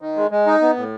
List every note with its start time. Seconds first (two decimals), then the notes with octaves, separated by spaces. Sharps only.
0.01 D#3
0.16 G#3
0.31 G#3
0.46 D#4
0.62 B3
0.77 A2